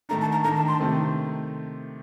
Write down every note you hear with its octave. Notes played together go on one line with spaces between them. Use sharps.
D#3 A3 D4 A#5
A5
A#5
D#3 A3 D4 A#5
A5
C6
C3 D#3 A3 C4